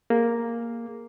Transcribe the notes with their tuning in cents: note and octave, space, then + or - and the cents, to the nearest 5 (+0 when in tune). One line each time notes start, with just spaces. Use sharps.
A#3 +0 G#4 +0